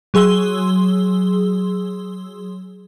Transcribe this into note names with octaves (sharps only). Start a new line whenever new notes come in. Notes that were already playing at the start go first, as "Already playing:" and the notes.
F#3 G#4 C6 E6 G7